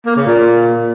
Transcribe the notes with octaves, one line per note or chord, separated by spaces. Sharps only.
A#3
C#3
A#2